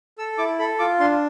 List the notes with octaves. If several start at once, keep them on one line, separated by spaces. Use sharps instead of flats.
A4 E6
E4 D6
A4 B5
F4 D6
D4 C6